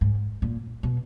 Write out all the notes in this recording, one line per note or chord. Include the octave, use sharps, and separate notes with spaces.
G#2
A#2
B2